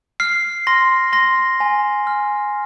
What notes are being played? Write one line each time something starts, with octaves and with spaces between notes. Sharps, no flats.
F6 C7
C6 A#6
C6 A#6
G#5
F6